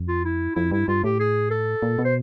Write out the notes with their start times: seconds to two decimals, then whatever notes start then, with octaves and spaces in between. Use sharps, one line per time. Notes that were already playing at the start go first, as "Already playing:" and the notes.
Already playing: F2
0.08 F4
0.25 E4
0.55 F2 E4
0.72 G2 E4
0.88 G2 F4
1.04 A2 G4
1.20 G#4
1.51 A4
1.82 A#2
1.99 B2
2.05 C5